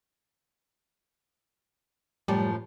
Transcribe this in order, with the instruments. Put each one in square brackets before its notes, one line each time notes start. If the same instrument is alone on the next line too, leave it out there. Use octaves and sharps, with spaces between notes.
[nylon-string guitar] F#2 A2 F3 [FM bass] G3